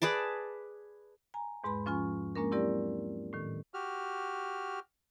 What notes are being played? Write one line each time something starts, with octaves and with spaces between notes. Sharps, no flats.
G#4 B4 D5 A5
G#5 A#5
E2 G#2 G#3 B4 B5 C6
F3 C#4 F4 G#5 C#6
G#3 A#3 C#4 D4 A#4
F#3 C4 E4 G4 A#4 D5
A2 D#3
F#4 G4 F6